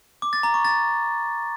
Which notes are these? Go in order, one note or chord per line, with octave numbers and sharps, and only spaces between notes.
D6
A6
A#5
C#6
A6